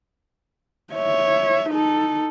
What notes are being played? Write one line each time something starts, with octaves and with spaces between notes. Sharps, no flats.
C#5 E5
D#4 A4